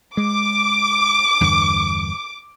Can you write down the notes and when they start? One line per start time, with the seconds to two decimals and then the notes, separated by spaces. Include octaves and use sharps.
0.17 G#3 D6
1.41 E2 G2 D3